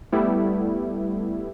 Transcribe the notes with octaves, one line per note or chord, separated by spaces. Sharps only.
G3 A3 B3 E4